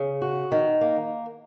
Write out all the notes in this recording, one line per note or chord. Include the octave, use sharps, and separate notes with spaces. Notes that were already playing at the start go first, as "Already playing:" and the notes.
Already playing: C#3
F#4
D#3
A#3